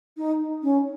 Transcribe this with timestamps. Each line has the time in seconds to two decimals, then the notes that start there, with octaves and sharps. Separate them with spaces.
0.17 D#4
0.63 C#4